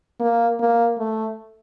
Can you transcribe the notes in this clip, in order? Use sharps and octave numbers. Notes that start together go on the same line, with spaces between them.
A#3
A#3
A3